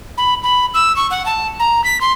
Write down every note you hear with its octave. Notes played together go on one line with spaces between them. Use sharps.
B5
B5
E6
C#6
F#5
A5
A#5
B6
C6